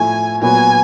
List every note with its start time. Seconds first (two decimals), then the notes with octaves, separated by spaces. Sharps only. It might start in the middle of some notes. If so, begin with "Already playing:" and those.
Already playing: A2 F3 A3 G#5
0.42 A#2 F#3 B3 G#5